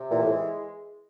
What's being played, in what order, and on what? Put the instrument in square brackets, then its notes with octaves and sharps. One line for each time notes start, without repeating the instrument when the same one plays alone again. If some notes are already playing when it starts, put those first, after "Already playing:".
Already playing: [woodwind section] C3
[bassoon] A#2 [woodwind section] E3
[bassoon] A2
[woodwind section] G#3